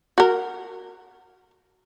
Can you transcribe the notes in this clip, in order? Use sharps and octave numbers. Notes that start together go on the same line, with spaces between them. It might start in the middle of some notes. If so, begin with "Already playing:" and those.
F#4 A#4